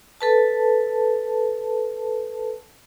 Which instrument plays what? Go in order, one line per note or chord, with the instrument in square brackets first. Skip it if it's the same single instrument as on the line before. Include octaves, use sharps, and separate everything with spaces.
[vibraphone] A4 B4 A5